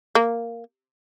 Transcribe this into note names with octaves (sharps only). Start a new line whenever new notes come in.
A#3